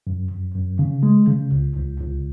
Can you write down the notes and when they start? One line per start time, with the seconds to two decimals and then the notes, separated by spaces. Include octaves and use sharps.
0.07 F#2
0.31 F#2
0.55 F#2
0.79 C#3
1.03 G#3
1.28 C#3
1.52 C#2
1.76 C#2
2.00 C#2